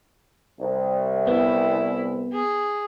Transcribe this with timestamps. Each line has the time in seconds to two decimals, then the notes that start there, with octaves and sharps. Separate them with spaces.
0.60 C2
1.27 B3 E4
2.33 G#4